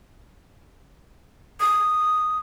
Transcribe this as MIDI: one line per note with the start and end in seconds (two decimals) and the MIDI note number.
1.61 2.38 87